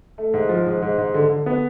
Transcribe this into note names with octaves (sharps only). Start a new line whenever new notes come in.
A3
G#2
F3
G#2
G#2
G#2
D3
D3
B3